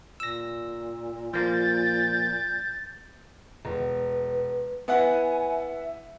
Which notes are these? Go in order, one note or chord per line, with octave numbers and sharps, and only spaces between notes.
A#2 E6 A#6
F3 A#3 G6 A6
E1 B4
B3 E4 F#5 G#5
E5